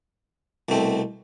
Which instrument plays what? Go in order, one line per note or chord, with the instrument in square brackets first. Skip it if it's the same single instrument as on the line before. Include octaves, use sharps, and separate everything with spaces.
[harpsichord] C2 B2 A3 C4